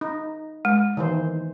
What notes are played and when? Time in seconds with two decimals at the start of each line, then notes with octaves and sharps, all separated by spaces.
0.01 D#4
0.65 G#3
0.97 D#3 E3 C5